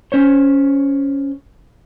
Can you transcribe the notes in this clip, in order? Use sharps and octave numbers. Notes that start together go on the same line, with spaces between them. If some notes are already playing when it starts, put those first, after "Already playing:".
C#4 C5 C#5